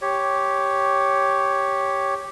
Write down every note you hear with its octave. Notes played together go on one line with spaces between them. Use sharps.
G4 C#5